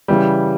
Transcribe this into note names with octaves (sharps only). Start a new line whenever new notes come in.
C#3 E3 G3